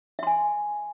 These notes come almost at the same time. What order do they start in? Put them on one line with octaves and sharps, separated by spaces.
E5 C6 G#5